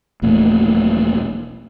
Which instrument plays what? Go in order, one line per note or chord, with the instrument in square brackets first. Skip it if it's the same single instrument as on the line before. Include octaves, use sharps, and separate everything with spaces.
[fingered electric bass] E1 A#1 A#2 A3